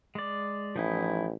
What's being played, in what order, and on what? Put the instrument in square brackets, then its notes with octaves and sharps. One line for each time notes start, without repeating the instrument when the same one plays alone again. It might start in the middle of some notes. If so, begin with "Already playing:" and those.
[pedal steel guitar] G#3 D5
[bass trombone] A1 [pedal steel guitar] F3 D#4 E4